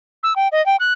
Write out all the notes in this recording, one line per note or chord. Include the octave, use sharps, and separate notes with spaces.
E6
G5
D#5
G5
F#6